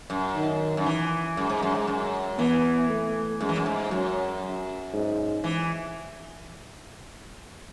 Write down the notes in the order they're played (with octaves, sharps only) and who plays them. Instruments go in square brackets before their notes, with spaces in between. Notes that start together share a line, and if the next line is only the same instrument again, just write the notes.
[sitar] F#2
[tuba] D#3
[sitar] F#2
E3
[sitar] F#2 [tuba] G#3
[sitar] G#2
F#2
G#2
F#2
[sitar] E3 [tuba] B3
[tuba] A3
[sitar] F#2 [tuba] G#3
[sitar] E3
F#2
G#2
[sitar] F#2 [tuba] F#3
[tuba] G#2
[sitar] E3